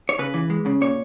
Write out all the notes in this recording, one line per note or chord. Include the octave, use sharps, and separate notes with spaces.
C#5
C#3 B4
E3
G#3
C#3
A#2 C#5